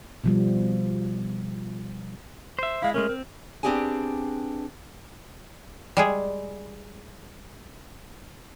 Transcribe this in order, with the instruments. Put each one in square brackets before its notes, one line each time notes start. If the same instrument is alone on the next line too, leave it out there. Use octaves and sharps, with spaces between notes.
[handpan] B2 F3 G3
[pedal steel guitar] C5 E5
[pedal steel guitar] G#3 E4 [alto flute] F5
[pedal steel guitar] G#3 A3 C#4 [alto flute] A#4
[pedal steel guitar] C4
[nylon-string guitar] B3 C4 D4 G4 G#4 G#5
[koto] G3 G#3 G#4